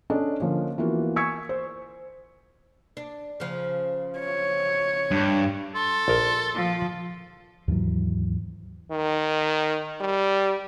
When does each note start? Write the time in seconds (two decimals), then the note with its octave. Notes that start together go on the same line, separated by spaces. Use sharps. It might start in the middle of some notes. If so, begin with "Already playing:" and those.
0.10 C#4 D4 A4 D5 D#5
0.40 D3 F3 A#3 C#4
0.78 E3 A#3 B3 F4 F#4
1.16 G#5 C#6 E6 G#6 B6 C#7
1.49 C5
2.97 D4
3.40 C#3 F3
4.19 C#5
5.11 G2
5.75 A4 C6
6.08 A#1 A#4
6.55 F3
7.68 D#2 G#2 E3 F#3
8.91 D#3
10.01 G3